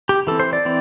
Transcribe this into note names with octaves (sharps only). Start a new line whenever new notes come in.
G4
E3 C4 A4
C5
D5
E3 C4